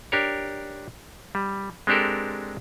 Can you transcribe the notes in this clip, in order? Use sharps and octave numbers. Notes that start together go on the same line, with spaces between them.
D4 G4 A#4 C#5
G3
G#3 C4 D4 G4 A4 A#4